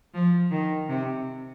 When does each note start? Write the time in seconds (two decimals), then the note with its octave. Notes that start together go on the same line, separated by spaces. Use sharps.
0.14 F3
0.51 D#3
0.89 C3